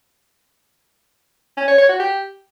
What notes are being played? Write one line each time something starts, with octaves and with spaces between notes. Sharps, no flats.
C#4
C#5
C#5
F#4
G4